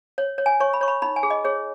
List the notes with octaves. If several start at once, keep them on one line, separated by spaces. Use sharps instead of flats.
C#5
C#5
G#5
C#5 C#6
B5
C#5 C#6
B5
D#4 B5
G#5
G#4
D#5
G#4 C#5